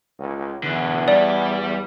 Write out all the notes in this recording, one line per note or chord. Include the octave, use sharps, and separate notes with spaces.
C#2
E2 D3 E3
G3 D5